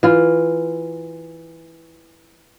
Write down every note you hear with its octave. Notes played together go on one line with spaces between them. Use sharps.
E3 F4